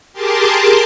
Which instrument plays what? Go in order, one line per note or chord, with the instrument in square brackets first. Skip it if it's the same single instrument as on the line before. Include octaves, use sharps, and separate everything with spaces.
[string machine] G4 G#4 A#4 A5 C6 D6